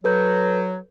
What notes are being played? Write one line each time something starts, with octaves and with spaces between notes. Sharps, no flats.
F#3 A4 B4 G6